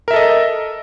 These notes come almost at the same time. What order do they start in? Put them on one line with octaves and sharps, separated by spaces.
A#4 E5 A4 D#5